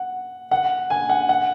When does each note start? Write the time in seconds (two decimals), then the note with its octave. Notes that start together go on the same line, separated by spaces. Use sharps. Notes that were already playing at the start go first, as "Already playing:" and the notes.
Already playing: F#5
0.51 F#5
0.90 G#5
1.09 F#5
1.29 F#5